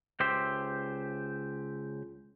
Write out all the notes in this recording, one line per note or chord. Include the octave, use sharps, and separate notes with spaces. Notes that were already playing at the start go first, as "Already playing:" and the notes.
C#2 G4 C5 E5